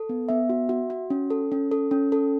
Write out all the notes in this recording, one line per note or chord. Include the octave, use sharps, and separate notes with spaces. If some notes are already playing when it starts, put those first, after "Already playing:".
Already playing: A4
B3
B3 E5
F#4
F#4
F#4
C#4
A4
C#4
A4
C#4
A4